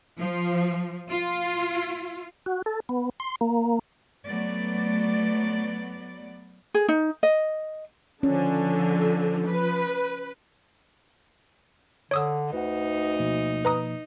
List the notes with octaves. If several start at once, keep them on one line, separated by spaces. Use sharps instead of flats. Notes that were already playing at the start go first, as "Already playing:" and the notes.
F3
F4
F#4
A4
B3
C6
A#3
F#3 A3 B3 D5
G#4
D#4
D#5
D3 F3 C#4
B4
D3 C#5 D#6 E6
D2 D#4 B4 F#5
B2 F3 A#3
B4 A#5 D#6